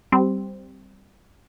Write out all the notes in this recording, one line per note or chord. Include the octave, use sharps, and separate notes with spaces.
G3 C4